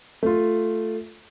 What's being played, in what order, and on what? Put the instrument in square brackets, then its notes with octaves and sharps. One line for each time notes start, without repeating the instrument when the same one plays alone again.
[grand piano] A3 F4